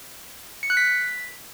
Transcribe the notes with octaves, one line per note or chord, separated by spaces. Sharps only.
C#7
F#6
B6